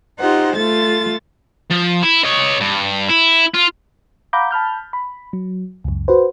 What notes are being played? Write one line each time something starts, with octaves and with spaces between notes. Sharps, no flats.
D#4 F4 G4 C5 F#5
A3 F4 A4 A6
F3
E4
C#5 D#5
G2
E4
F4
F5 F#5 A#5 B5 D6 G6
A5 B5 F6 G6
B5
F#3
C#2 F#2
F#4 B4 C5